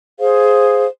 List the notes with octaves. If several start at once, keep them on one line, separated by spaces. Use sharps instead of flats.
G#4 C5 F5